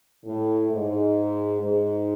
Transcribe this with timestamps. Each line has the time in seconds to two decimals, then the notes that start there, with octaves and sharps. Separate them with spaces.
0.25 A2
0.71 G#2
1.61 G#2